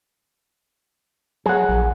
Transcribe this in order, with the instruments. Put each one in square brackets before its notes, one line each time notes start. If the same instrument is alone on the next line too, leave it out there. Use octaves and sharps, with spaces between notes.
[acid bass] F#3 [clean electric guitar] G#4 F#5
[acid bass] A#1